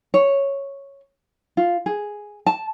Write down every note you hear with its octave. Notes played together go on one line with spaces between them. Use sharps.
C#5
F4
G#4
A5